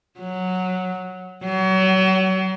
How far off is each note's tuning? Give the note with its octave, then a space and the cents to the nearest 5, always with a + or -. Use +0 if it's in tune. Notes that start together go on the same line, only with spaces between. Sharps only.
F#3 -5
F#3 +30